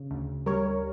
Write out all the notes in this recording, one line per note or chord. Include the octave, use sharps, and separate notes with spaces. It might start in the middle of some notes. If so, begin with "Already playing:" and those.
Already playing: C#3
D2
G3 A#4 C#5